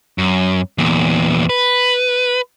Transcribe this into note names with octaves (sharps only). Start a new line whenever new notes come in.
F#2
E2 A#2
B4